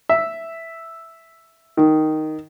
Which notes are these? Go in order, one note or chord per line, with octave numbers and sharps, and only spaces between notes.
E5
D#3